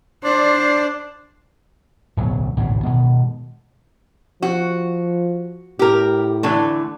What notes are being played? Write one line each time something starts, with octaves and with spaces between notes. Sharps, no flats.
D4 C5 D5
D1 B1 F#3
A1 D2 G#2 B2
B2 D#3 G#3
F3 F#4
A2 G4 A#4
D3 E3 A3